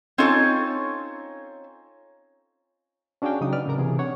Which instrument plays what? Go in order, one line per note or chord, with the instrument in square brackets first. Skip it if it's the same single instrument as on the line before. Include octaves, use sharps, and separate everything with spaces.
[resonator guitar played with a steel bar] C4 C#4 D#4 F4 A4 C#5
[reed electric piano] C#4 D4 F#4 G#4 F5 G5
C#3 F#3 D4 D#4 D#6
B4 D5 F6
A2 C#3 F#3 F#4 A#4 A#5
C3 E3 G#4
D4 C#5 F#5